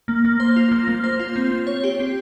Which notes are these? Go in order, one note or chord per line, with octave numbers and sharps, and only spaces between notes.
A#3
A#3
C5
F4
A#3
A#3
C5
F4
C4
C4
C#5
G4
C4